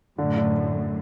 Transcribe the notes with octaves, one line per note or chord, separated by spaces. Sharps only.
F#2 A2 D3
D3